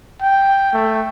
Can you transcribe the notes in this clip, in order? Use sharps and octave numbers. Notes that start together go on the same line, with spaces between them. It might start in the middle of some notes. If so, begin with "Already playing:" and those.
G5
A3